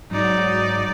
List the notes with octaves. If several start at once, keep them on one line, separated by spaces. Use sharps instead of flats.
G#2 F#3 D#4 D5